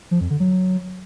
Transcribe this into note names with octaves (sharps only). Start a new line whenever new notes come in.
F3
F2
D3
F#3